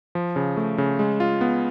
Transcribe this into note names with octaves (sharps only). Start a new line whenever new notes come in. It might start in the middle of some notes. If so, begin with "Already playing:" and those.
F3
C#3
A3
C#3
G#3
F4
B3